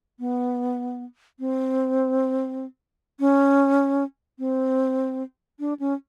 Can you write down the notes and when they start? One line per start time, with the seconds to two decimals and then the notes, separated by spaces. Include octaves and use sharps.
0.19 B3
1.40 C4
3.20 C#4
4.39 C4
5.60 D4
5.80 C#4